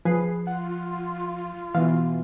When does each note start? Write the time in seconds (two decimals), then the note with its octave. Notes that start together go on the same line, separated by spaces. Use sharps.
0.05 F3 G#4 B4 C7
0.47 F4 F#5
1.75 B2 E3 F5